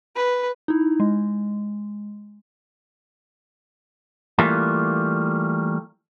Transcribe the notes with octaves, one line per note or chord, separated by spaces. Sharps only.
B4
D#4 E4
G#3
E3 G3 A3 A#3 F4